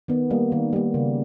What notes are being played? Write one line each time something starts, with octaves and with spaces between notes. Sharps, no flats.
D#3 B3
G3 A#3
D#3
G3 A#3
C#3